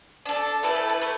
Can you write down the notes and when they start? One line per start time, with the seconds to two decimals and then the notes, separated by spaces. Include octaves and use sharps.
0.26 D4 A4
0.63 A3 E4 A4 B4
0.76 A4
0.89 B4
1.01 A3 B4